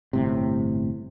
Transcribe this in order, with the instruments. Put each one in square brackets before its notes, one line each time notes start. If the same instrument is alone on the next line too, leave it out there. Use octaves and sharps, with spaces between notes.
[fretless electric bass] G1 A2 C3